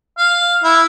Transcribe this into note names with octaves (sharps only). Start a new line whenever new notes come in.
F5
E4